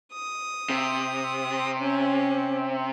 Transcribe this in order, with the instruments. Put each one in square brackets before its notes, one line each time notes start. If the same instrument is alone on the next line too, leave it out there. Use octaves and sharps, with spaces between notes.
[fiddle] D#6
[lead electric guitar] C3
[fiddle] C#4